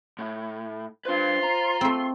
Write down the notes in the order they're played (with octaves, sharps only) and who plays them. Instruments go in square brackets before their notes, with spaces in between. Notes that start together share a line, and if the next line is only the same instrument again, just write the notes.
[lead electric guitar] A2
[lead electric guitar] D4 B4 [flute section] F4 C6 [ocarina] C5
[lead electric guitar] A#5
[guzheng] A3 C4